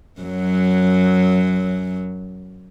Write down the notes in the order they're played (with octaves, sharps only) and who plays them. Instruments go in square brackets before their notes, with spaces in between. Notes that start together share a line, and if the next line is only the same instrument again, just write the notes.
[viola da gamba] F#2 F#3